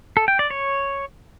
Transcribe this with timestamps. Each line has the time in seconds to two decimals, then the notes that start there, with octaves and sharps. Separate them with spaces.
0.17 A4
0.28 G5
0.39 D5
0.50 C#5